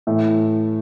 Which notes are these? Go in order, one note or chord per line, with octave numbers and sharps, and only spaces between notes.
A2 E3 A3